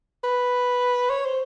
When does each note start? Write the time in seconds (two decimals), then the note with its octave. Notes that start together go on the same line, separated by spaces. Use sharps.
0.24 B4
1.10 C#5
1.25 C5